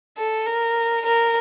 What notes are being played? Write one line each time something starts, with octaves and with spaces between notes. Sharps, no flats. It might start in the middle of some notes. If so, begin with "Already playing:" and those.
A4
A#4
A#4